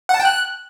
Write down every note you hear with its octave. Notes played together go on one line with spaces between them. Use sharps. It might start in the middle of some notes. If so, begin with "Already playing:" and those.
F#5
A5
G5
F#6